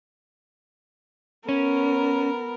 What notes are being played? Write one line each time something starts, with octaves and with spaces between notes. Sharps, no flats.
B3 C#4 A#4